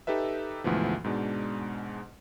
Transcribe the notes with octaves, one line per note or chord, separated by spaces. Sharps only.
D#4 G4 A4 B4 E5
D2 G#2 B2 E3 F3
G#2 B2 G#3 D4